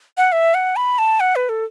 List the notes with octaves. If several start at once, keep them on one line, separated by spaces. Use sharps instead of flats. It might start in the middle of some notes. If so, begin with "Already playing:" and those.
F#5
E5
F#5
B5
A5
F#5
B4
A4